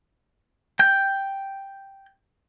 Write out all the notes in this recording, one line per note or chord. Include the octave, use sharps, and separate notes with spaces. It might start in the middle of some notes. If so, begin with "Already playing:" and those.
G5 G6